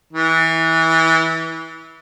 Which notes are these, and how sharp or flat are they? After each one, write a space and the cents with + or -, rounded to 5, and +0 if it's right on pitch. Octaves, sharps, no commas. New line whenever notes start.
E3 -20